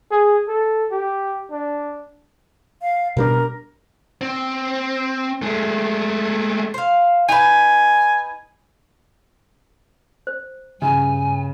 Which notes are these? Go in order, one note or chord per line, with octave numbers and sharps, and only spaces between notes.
G#4
A4
G4
D4
F5
B2 G3 D4 A#4
C4
G#3 A3
C5 F5
D#4 B4 G#5
C5
G2 C#3 G#5